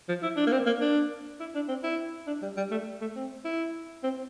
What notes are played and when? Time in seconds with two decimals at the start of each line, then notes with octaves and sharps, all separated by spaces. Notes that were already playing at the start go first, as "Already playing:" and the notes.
0.08 F3
0.23 E4
0.37 D4
0.47 A#3
0.52 C4
0.66 A#3
0.81 D4
1.40 E4
1.55 D4
1.68 C4
1.83 E4
2.27 D4
2.42 G3
2.57 G3
2.71 A3
3.01 A3
3.16 C4
3.45 E4
4.03 C4